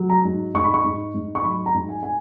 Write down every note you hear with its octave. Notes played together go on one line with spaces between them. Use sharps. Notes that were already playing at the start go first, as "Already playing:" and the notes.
Already playing: F#3
A#5
G#2
G#2 C#6
B5
C#6
G#2
G#2
C#6
F#3 B5
A#5
G#2
G#5
G#5